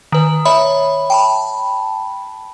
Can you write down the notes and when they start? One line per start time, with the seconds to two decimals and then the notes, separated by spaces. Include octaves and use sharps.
0.12 D#3 B4
0.45 C#5 E5 B5
1.10 G5 A5 B5